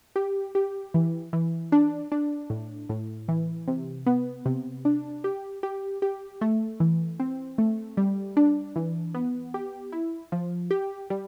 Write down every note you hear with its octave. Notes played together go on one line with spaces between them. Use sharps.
G4
G4
E3
E3
D4
D4
A2
A2
E3
C3
B3
C3
D4
G4
G4
G4
A3
E3
C4
A3
G3
D4
E3
B3
G4
E4
F3
G4
G3